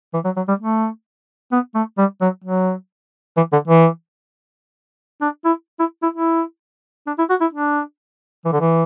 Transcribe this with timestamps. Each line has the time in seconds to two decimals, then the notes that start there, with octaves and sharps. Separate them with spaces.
0.14 E3
0.25 F#3
0.36 F#3
0.48 G3
0.59 A3
1.52 B3
1.75 A3
1.98 G3
2.21 F#3
2.44 F#3
3.37 E3
3.52 D3
3.67 E3
5.21 D4
5.45 E4
5.79 E4
6.03 E4
6.14 E4
7.07 D4
7.18 E4
7.30 F#4
7.41 E4
7.53 D4
8.45 E3
8.53 D3
8.60 E3